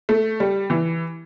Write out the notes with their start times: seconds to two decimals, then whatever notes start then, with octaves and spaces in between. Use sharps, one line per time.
0.09 A3
0.40 G3
0.70 E3